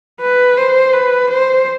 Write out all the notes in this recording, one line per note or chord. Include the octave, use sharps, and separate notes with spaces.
B4
C5
B4
C5